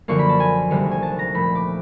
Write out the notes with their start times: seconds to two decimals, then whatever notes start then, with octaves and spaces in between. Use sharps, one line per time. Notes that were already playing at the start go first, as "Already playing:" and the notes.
0.08 F#2 D3 F3 A#3 C#6
0.19 B5
0.29 A5
0.40 G#5
0.70 D2 C3 D#3 G3 A#3
0.91 G#5
1.03 A5
1.19 A#5
1.34 A#2 F3 A3 B5
1.55 D6